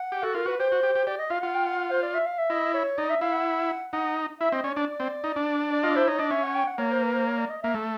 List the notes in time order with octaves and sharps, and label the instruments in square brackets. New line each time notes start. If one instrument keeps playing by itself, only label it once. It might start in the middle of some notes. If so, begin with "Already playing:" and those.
Already playing: [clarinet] F#5
[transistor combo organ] G4
[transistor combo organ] F#4 [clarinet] A4
[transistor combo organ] F4 [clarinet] A#4
[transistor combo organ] F#4 [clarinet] B4
[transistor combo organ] G4 [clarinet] C5
[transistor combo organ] F#4
G4
G4
[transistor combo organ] G4 [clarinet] D5
[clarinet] D#5
[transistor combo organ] F4 [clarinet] F5
[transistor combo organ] F4 [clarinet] F#5
[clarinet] G5
F#5
F#5
C5
D5
E5
F5
E5
[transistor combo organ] E4 [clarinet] D#5
[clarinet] C#5
[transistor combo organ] D#4 [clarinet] D5
[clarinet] E5
[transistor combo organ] E4 [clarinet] F5
[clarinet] F#5
[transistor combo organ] D#4 [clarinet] F#5
[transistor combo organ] E4 [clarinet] E5
[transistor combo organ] C4 [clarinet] D#5
[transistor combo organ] C#4 [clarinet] D5
[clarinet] C#5
[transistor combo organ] D4 [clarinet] D5
[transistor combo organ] C4
D#4
D4
[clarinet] D5
[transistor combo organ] F4 [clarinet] D#5
[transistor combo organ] E4 [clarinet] C5
[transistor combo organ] D#4 [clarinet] C#5
[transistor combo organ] D4 [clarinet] D#5
[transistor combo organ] C#4 [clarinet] E5
[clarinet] F#5
G5
F#5
[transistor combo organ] A#3 [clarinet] C#5
[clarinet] C5
B4
C5
C#5
D5
D#5
[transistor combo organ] A#3 [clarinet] E5
[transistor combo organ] A3